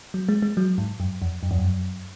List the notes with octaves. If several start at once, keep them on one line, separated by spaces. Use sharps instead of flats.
F#3
G#3
G#3
F#3
G#2
F#2
F2
F#2
F2
F#2